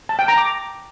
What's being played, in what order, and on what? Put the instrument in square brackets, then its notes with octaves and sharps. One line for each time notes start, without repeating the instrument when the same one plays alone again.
[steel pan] A5
G5
A#5
D6